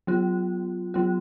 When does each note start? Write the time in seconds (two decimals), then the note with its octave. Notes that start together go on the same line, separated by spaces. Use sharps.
0.07 F#3 B3 F4
0.94 F#3 B3 F4